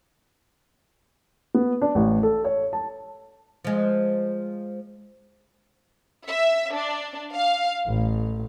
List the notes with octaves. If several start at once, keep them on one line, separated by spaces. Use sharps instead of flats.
B3
D4
A1
A4
C#5
A5
F3 G#3
E5
D4
F5
A1